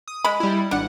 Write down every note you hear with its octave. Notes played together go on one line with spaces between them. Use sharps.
D#6
G#3 B5
G3 E4
G#1 D4 F#5